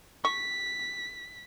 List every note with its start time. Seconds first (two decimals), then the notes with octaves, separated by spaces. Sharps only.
0.25 C#6 B6